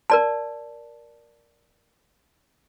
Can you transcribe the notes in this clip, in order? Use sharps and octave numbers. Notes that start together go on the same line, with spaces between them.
A#4 D5 A5